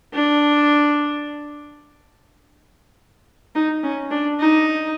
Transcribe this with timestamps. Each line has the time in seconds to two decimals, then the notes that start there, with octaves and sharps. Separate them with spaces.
0.14 D4
3.55 D#4
3.83 C#4
4.11 D4
4.40 D#4